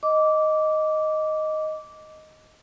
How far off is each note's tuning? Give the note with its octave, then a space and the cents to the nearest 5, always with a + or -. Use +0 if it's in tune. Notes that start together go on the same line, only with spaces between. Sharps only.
D#5 +0 D6 -15